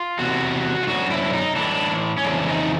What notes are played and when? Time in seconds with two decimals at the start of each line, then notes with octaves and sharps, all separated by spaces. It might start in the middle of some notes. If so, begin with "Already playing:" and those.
Already playing: F4
0.19 E2 C3 F#4
0.83 F4
0.87 F#2 D3 F#4
1.10 E4
1.33 D#4
1.56 A2 E3 D4
2.18 C#4
2.24 F2 C#3 E3 D4
2.48 D#4